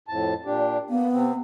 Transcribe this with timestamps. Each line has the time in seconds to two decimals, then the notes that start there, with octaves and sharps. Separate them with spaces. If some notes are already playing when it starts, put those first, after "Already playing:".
0.08 F2 A2 A5
0.45 A#2 D4 G4
0.90 A#3 B3
1.12 C3 C4